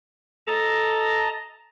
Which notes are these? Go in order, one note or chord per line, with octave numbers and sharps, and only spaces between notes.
A4 D#5 A5 A#5